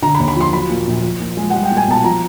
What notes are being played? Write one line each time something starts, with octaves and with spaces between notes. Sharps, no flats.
D3 A#5
B5
D#2
B5
F3 C6
F#3 B5
A#2
A#1
F3
A#2
G#3
G3 F#5
G5
A#2
G#5
B1 A5
F3 A#5